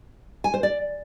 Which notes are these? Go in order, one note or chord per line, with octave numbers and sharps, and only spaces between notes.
G#5
C5
D5